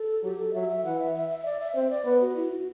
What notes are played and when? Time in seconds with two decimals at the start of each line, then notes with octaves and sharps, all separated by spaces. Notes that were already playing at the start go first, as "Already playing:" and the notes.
Already playing: A4
0.23 F#3 G4
0.38 A4
0.53 F#3 E5
0.70 E5
0.84 E3 F#5
0.99 E5
1.15 E5
1.30 E5
1.46 D5
1.60 E5
1.75 C4 C5
1.90 D5
2.05 B3 B4
2.21 F#4
2.36 E4
2.52 F#4